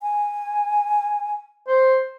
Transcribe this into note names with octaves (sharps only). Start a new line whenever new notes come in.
G#5
C5